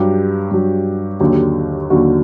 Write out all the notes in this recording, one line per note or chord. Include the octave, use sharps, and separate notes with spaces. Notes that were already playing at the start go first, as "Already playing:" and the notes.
Already playing: G2 F#3 G4
G2 F#3
D#2 D3 F#3 G4
D#2 D3 F#3 F#4